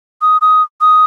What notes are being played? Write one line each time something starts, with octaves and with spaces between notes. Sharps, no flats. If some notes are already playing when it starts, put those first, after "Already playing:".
D#6
D#6
D#6